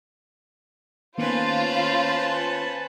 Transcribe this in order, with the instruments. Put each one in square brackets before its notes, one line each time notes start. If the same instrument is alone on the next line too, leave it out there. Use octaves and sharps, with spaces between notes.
[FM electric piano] D#3 A#3 B3 [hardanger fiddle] C#4 B4 [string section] F4 [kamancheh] C5 A5